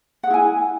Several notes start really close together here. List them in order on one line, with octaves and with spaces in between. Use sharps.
F#5 G#4 E4 G#5